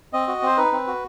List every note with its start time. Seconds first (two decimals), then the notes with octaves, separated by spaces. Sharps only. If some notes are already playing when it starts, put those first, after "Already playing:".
0.13 C4 D#5
0.28 F#4
0.42 C4 C5
0.57 D#4 B4
0.72 C4
0.87 F#4